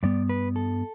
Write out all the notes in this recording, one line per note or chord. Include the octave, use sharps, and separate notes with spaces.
G2 G3 B3 D5
B4
A4